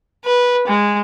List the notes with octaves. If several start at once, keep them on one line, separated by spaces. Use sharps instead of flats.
B4
G#3